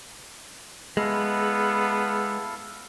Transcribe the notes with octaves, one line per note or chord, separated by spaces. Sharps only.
G#3 B3 E4 A4 F5